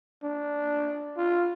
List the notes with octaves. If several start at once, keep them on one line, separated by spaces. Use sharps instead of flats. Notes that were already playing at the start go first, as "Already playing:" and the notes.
D4
F4